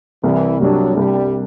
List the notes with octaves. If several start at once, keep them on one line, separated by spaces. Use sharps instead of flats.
C2 E3
C3 F#3 G3 D4
C2 G3